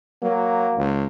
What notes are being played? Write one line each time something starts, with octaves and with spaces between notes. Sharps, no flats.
F#3 A#3
C#2